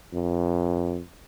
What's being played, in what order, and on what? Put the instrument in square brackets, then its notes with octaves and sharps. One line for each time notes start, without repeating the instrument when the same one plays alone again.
[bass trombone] F2